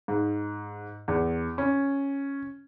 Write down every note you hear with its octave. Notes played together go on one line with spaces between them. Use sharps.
G#2
E2
C#4